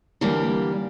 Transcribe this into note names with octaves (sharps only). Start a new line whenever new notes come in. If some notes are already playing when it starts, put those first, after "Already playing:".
D3 E3 G3 A#3